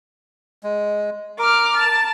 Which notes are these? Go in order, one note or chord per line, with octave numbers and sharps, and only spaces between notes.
G#3
A#4 D6 F6
A5